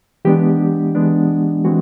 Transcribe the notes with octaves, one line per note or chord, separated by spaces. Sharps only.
E3 G#3 B3 D4 G4
E3 G#3 B3 D4
E3 G#3 C4 F#4